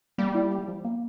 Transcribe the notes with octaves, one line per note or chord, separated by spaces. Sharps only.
G3 A#3
E4
G4
F3
A#3